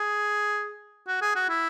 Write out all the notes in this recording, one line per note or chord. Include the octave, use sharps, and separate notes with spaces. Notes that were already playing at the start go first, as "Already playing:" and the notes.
Already playing: G#4
F#4
G#4
F#4
E4